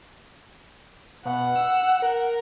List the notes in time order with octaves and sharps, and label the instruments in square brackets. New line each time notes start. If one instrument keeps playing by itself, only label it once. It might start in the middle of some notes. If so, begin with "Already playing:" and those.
[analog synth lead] B2 [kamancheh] F#5
[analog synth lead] E6
A#4